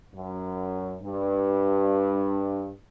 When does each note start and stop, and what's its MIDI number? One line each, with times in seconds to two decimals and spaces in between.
0.14 0.95 42
1.02 2.69 43